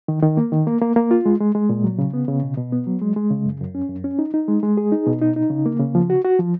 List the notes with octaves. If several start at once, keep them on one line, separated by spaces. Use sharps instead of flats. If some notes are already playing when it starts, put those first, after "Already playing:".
D#3
D#3
A#3
D#3
A#3
A#3
A#3
F4
G#3
G#3
G#3
A#2
F#3
C#3
B3
C#3
B2
B2
B3
F#3
G#3
G#3
C#3
F#2
F#2
C#4
F#2
C#4
D#4
D#4
G#3
G#3
G#4
D#4
B2
D#4
D#4
C#3
A#3
C#3
F3
F#4
F#4
F3